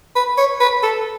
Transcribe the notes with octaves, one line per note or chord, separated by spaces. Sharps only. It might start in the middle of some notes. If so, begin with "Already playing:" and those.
B4
C#5
B4
A4